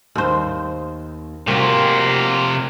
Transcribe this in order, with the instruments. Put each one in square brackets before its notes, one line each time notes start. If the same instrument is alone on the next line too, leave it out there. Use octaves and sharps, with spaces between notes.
[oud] D#2 C5
[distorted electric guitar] C3 F4 [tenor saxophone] A#3 [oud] C4 F#4